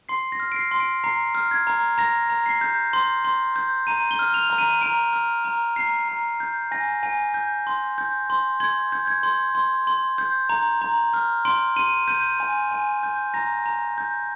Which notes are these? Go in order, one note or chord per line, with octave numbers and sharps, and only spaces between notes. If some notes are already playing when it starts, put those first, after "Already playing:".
C6 C7
A#6
F6
D7
C7
C6
D7
A#5 C7
F6
G#6
A#5
A#5 A#6
A#5
C7
G6
C6
C6
G6
A#5 D#7
G7
F6
F7
A#5
D#7
A#5 D7
F6
A#5
A#5 C7
A#5
G6
G#5 A#6
G#5
G6
C6
G6
C6
C6 G#6
G6
G#6
C6
C6
C6
G6
A#5
A#5
F6
C6 D7
C6 D#7
G6 D#7
G#5
G#5
G6
A#5 A#6
A#5
G6